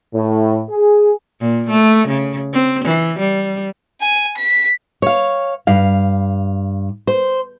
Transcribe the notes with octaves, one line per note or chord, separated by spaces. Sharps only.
A2
G#4
A#2
A3
C#3
C4
E3
G3
G#5
B6
C#5 F5
G2 F5
C5